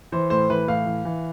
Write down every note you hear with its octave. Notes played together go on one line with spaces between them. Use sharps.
E3 C5
A2 C5
E3 B4
A2 F5
E3
E3